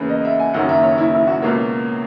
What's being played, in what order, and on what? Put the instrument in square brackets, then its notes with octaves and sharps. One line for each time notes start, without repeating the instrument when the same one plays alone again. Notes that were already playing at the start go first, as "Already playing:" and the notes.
Already playing: [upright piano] E2 C#3 A#3 B4
D#5
E5
G#5
F#1 F#2 D#3 F#3 A#3 F#5
E5
C#5
E4
E4
F#4
C#2 B2 F#3 A#3 C#5